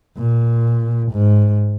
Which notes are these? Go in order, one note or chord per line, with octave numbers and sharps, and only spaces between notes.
A#2
G#2